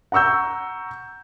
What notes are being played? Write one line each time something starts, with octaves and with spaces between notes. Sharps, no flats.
F#5 A#5 C#6 E6 G6